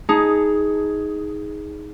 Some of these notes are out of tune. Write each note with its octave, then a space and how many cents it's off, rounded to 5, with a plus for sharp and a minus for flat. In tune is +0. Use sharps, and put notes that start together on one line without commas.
D#4 +15 G#4 +0 A5 +0